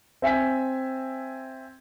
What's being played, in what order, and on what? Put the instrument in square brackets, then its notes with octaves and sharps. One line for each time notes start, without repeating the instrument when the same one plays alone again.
[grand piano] C4 E5 G#5 B6